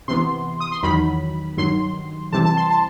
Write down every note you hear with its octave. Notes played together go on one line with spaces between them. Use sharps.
C3 E3 B3 C6
D#6
C6
E2 D#3 F#3 B5
G2 D#3 F#3 C6
C3 E3 G3 C4 A5
A5
C6
A5